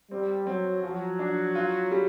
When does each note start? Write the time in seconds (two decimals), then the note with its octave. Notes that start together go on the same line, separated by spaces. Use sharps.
0.11 G3 C4
0.47 F#3 C4
0.83 F3 F#3
1.19 D4
1.55 F4
1.91 G3